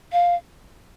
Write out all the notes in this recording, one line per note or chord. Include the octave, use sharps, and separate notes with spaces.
F5